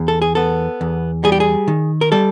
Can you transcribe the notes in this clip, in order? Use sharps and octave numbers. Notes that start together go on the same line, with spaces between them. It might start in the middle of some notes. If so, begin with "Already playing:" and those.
Already playing: E2
A4
G#4
B3 A4
E2
G3 G#4
G4
G#4
D#3
A#4
G3 A4